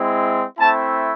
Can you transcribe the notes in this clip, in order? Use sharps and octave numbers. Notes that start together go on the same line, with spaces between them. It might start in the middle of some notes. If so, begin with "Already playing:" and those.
Already playing: G#3 C4 E4
A3 C4 E4 A5